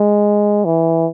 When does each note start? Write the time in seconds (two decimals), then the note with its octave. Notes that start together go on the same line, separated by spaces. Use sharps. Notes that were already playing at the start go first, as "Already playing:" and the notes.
Already playing: G#3
0.65 E3